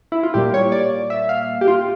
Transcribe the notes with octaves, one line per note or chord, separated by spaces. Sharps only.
E4
F4
A#2 G3 A#3 G4
C#5
D5
E5
F5
G4
F4